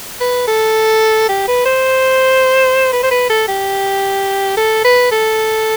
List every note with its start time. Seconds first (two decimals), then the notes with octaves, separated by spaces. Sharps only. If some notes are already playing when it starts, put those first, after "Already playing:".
0.21 B4
0.48 A4
1.29 G4
1.48 B4
1.65 C5
2.93 B4
3.03 C5
3.11 B4
3.30 A4
3.48 G4
4.57 A4
4.84 B4
5.12 A4